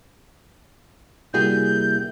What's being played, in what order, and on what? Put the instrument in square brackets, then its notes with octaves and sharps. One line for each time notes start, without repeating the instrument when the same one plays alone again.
[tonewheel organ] C3 A#3 E4 [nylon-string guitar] G3 F#4 G#4 [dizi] G6